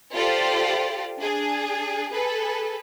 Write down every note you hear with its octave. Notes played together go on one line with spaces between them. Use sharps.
F4 G4 A4 C5 D5
D4 G#4
G#4 A4 B4